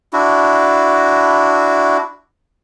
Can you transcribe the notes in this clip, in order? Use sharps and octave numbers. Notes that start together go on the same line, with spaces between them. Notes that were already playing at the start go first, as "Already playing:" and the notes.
D4 E4 F#4